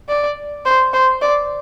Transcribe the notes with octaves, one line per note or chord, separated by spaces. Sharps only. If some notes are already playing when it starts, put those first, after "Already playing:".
D5
C5
C5
D5